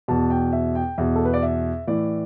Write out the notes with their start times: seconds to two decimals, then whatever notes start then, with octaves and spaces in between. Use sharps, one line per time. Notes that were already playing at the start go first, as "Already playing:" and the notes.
0.08 E2 B2 A5
0.30 G5
0.52 E5
0.75 G5
0.98 E2 B2 E5
1.15 A4
1.25 B4
1.34 D5
1.42 E5
1.87 A2 E3 D5